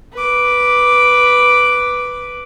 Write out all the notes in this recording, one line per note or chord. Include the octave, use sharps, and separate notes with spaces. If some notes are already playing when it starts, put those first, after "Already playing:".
B4 D6